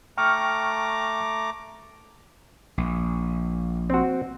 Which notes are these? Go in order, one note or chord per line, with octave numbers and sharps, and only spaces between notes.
A3 G5 A#5 C#6 D6 F6
A#1
C4 F#4